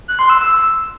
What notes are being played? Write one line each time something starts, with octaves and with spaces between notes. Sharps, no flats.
F#6
C6
E6
E6